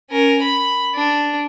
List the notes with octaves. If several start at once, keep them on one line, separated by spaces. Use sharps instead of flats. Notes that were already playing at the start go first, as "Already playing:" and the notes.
C#4 A#4
B5
D4